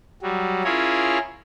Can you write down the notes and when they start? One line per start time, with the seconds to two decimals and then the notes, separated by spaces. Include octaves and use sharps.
0.22 F#3 G3
0.64 C#4 E4 F4 G#4 A#4 C#5